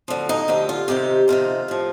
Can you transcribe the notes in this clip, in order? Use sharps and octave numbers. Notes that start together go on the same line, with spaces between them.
D2 D3 F3
D#4
D2 D3 F3 G4
F4
F2 C3 D#3 G4
F2 C3 D#3 F4
A2 F3